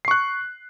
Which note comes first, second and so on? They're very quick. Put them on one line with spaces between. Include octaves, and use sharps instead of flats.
C7 C#6 F#6